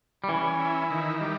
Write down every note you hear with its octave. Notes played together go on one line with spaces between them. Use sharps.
G3
E3 C#4
E4
D#3
G3